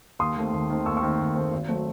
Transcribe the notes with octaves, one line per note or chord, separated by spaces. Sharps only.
D#2 C6 D#6
D#3 A3 C4
D#2
D#3 A3 C4
D#2 C#6 E6
C#6 E6
D#3 A3 C4
D#2
D#3 A3 C4
G#1
F#3 A3 C4